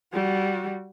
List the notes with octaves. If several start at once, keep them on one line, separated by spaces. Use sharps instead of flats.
G3 F#4